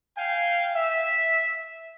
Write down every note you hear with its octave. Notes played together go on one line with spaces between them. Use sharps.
F5 G5 G#5
E5